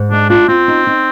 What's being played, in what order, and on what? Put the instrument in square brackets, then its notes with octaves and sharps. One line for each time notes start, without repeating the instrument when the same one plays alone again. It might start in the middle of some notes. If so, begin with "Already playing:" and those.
Already playing: [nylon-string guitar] G#2
[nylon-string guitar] G#3 [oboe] D4
[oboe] D4 [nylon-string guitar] F4
[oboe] C4 [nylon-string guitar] F4
[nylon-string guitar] D#4
D#4